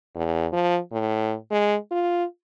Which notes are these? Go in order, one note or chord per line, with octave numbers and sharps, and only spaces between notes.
E2
F3
A2
G#3
F4